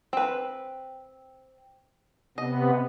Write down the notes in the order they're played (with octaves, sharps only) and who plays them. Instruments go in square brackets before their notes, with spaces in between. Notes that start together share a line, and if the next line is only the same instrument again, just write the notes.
[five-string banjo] C4 B4
[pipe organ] C3 B3 [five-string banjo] D#5